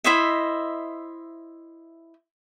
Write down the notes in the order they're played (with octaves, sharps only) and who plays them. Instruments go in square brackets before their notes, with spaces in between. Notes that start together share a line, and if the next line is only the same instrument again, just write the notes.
[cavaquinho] E4 C5 D#5 E5